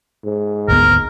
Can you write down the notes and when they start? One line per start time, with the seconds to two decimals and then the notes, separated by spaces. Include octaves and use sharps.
0.24 G#2
0.68 G#1 D2 B3 A#4